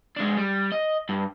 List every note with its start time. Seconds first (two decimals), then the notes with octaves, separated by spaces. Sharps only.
0.17 G#3 D4
0.37 G3
0.72 D#5
1.09 G2